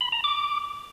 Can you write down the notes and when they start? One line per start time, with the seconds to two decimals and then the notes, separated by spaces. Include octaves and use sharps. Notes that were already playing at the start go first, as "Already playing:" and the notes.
0.01 B5
0.12 A#5
0.24 D6